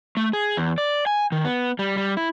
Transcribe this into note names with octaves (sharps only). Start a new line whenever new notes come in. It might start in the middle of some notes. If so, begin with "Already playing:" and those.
A3
G#4
E2
D5
G#5
D#3
B3
G3
G3
E4